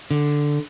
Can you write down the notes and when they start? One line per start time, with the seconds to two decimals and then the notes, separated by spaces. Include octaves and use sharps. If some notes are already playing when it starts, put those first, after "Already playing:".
0.11 D3